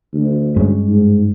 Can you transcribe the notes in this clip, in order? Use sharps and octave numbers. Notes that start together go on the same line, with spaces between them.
D2
G2 G#3 C#4
G#2